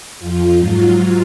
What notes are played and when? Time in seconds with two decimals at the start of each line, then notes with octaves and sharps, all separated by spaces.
0.20 F2 F3 F4
0.59 G#2 F#3